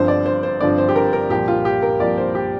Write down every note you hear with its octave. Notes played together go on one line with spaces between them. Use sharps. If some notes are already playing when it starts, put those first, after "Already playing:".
Already playing: G1 G2 D3 F3 C4 C5
D5
C5
C5
G1 G2 D3 F3 C4 D5
C5
G4
A#4
A#4
C2 A#2 F3 A#3 G4
F4
G4
A#4
C2 A#2 F3 A#3 D5
C5
G4